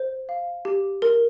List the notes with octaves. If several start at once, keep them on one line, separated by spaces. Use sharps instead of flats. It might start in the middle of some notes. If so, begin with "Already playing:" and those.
Already playing: C5
F5
G4
A#4